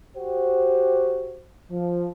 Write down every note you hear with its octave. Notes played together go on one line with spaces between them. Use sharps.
F#4 G4 C5
F3